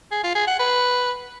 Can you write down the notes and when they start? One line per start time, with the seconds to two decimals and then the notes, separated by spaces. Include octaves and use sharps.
0.12 G#4
0.24 F4
0.36 G#4
0.48 F#5
0.59 B4